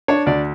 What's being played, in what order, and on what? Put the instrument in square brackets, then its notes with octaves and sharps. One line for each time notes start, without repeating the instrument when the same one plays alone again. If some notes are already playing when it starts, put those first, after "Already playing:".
[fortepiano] D4 C#5
D2 D5